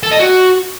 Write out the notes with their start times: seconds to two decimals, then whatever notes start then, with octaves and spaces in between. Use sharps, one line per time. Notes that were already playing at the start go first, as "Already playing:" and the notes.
0.03 A4
0.11 D#5
0.20 F#4